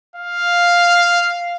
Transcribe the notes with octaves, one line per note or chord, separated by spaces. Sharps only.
F5